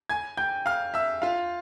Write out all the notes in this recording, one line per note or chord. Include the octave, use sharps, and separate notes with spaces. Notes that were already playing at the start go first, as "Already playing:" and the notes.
G#5 G#6
G5 G6
F5 F6
E5 E6
F4 F5